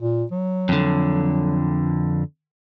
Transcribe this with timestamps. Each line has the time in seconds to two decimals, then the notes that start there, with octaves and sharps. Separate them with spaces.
0.01 A#2
0.32 F#3
0.69 F2 D3